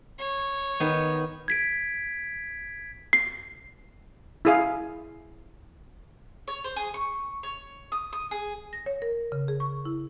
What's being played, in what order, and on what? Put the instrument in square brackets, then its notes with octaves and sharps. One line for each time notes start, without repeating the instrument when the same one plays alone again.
[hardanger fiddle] C#5
[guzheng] D#3 B3
[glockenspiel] G#6 B6 D7
[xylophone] C7
[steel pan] E4 G#4 F5
[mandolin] C#5
C5
G#4
C#6
C#5
D#6
D#6
G#4
[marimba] A#6
C#5
A#4
C#3
G#4
C#6
E4